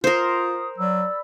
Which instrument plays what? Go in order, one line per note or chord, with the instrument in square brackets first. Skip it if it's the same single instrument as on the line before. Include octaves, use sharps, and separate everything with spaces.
[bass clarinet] F4 [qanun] A#4 C5 [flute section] D#6
[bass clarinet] F#3 [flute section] D5 B5 E6